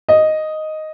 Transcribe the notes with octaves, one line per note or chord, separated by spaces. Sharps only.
D#5